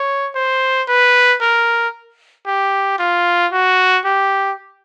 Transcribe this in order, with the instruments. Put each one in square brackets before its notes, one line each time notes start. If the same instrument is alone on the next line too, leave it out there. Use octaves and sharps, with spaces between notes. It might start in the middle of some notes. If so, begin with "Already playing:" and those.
Already playing: [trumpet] C#5
C5
B4
A#4
G4
F4
F#4
G4